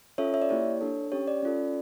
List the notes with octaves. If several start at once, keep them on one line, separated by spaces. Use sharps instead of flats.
C#4 F4 A4 C#5 E5
C#5 E5
D5
A#3 E4 G4 C#5
D4 A4
C#4 G4 C#5
D5
C#4 F4 A4